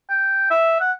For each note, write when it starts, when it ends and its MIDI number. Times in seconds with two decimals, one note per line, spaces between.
0.09 0.47 79
0.50 0.77 76
0.80 0.92 78